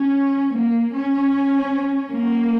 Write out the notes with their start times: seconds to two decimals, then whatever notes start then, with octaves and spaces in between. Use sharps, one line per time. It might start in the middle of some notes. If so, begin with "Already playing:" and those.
Already playing: C#4
0.55 A#3
0.96 C#4
2.15 A#3